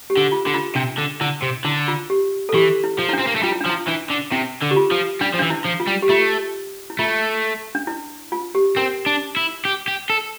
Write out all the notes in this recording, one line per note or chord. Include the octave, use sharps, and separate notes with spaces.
G4
D3
F4
D3
F4
C3 D4
D3
D3 E4
C3
D3 E4
F4
G4
A4
E3 G4
E4
F3
E4
D4
C4
A#3
A3
G3 F4
E4
D4
F3
E4
E3 D4
D3
C3 E4
D3
G4
F4
F3
G3 D4
F3
D4
E3
E4
F3
F4
G3
G4
A3 F4
E4
A3 F4
D4
E4
F4
G4
C4 A#4
D4
E4
G4
G4
A4